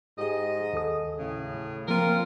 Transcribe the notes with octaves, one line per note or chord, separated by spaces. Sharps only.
G#2 G4 G#4 D#5
D#2 A4 D#6
A2 C#3
F3 A#3 C4 F4 A#4